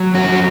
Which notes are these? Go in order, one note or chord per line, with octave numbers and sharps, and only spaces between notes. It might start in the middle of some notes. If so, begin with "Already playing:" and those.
Already playing: F#3
F2 F#4